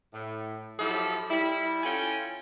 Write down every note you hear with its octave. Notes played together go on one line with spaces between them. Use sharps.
A2
F3 F#3 E4 G4 A4
G3 E4
C#4 F4 A4 G5 G#5